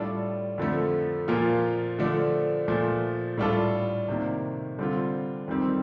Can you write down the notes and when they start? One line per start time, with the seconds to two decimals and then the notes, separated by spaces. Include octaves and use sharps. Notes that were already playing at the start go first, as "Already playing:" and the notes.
Already playing: A2 G3 D4 F4 A4
0.58 F2 D3 F3 A3
1.28 A#2 F3 A#3 F4
1.99 D3 F3 A3 D4
2.68 A#2 F3 A3
3.37 A2 G3 D4 F4 A4
4.08 C3 D#3 A#3
4.79 D3 G3 C4 F4
5.48 F2 D#3 G3 C4